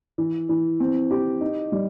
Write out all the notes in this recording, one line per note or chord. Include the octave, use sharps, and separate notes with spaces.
E3
E3
C4
G4
D#4
G3